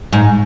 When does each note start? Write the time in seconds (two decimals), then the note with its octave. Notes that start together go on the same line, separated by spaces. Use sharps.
0.13 G#2